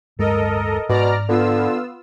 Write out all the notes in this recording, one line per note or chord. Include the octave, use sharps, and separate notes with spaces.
D1 G2 G#3 A4 A#4 D#5
G#2 B2 D5 A#5 F6
D3 B3 F4 E6